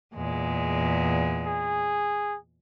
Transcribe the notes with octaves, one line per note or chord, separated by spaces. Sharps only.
E2 A#2 G#3
G#4